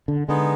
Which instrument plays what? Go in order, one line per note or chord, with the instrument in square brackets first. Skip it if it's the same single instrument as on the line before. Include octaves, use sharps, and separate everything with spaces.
[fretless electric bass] D3
[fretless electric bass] D3 [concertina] G#3 B3 D#4